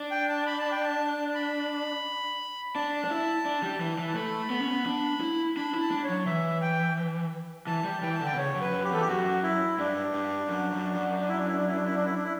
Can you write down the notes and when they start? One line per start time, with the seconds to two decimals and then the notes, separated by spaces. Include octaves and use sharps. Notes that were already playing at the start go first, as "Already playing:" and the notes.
Already playing: D4
0.11 G5
0.28 A5
0.46 B5
0.59 A5
0.71 G5
0.84 A5
1.35 B5
2.75 D4 A5
3.05 D4
3.10 E4
3.46 D4
3.63 G3
3.80 E3
3.99 E3
4.08 A5
4.15 A3 B5
4.50 B3
4.60 C#4
4.70 B3
4.86 D4
5.21 E4
5.56 D4 B5
5.74 E4
5.80 A5
5.91 D4
6.04 C#5
6.09 F#3
6.26 E3 E5
6.62 G5
7.67 E3 A5
7.84 G3
8.02 E3 G5
8.14 A5
8.21 D3
8.26 G5
8.34 B2
8.37 C#3 C#5
8.55 F#2
8.61 B4
8.72 F#2
8.84 G4
8.91 E2 A4
9.00 G4
9.08 F#2 F#4
9.43 E4
9.78 G2 D4
10.14 G2
10.49 F#2
10.72 F#2
10.95 F#2
11.19 D4
11.28 E4
11.38 D4
11.47 E4
11.57 D4
11.67 E4
11.75 D4
11.86 E4
11.95 D4
12.05 E4
12.14 D4
12.24 E4